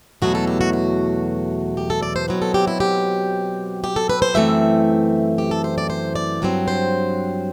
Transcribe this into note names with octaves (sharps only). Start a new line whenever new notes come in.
E2 B2 F#3 A3 F#4
A4
G4
F#4
F#4
G4
A4
D5
C5
B2 F#3 C4 B4
A4
G4
E4
G4
G4
A4
B4
C5
F#2 E3 A3 C4 E5
G4
A4
C5
D5
C5
D5
G2 F#3 C4
C5